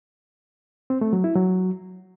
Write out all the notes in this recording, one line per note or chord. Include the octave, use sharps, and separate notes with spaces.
C4
A3
F#3
E4
F#3